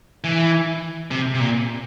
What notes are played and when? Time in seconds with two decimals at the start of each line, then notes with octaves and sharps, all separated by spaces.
0.24 E3
1.11 C3
1.34 C3
1.40 A#2